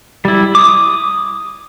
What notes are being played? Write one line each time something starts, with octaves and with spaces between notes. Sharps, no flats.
G3 E4
D6 D#6